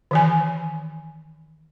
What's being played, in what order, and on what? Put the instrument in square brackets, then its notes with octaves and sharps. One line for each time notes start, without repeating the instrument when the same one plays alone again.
[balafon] D#3 E3 G#5